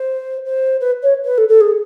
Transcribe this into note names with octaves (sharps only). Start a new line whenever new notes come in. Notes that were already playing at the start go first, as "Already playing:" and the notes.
Already playing: C5
C5
B4
C#5
B4
A4
A4
G#4